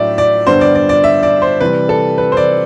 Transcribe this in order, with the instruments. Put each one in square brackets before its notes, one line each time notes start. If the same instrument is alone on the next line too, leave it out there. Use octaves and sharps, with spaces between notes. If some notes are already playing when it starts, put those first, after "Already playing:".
Already playing: [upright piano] A2 F#3 A3 D4 D5 E5
D5
G2 D3 G3 B3 C5
D5
D5
D5
E5
D5
C5
C3 E3 G3 B4
A4
B4
C5
D5